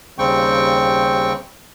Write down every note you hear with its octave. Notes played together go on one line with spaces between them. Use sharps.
D#2 C#3 G3 C4 G5 C#6